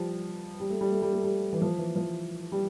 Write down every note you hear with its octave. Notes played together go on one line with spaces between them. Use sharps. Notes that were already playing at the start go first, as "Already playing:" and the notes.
Already playing: F3 G3
G3
A3
G3
A3
G3
A3
G3
E3
F3
E3
F3
G3